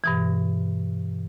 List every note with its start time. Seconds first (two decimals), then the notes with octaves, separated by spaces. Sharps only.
0.04 G2 B2 E3